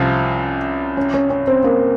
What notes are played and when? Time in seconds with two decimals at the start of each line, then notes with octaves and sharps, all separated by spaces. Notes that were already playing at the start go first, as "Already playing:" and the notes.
Already playing: C2 C3 F3 C#4
0.97 C#4 C#5
1.14 C#4 C#5
1.30 C#4 C#5
1.47 C4 C5
1.64 A#3 A#4